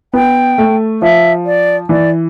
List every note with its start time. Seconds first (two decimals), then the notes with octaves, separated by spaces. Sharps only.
0.13 B3 G5
0.58 A3
1.01 F3 E5
1.45 D5
1.89 E3 D5